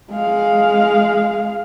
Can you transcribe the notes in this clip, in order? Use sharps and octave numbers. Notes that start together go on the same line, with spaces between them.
G#3 F5